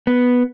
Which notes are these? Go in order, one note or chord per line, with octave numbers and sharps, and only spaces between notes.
B3